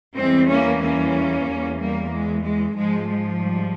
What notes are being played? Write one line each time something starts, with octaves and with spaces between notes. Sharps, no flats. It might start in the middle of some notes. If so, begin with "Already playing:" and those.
E2 E3 G3 G#3 C4
A#3 C#4
A#3 C#4
E2 E3 G3
G3 A#3
G#3
G#3
G#2 F3 G#3
G#3
G3